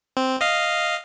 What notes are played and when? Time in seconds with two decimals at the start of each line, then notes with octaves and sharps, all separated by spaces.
0.17 C4
0.41 D#5 F5